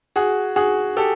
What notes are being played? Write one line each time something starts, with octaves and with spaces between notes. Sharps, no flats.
F#4 G#4
F#4 G#4
G4 A4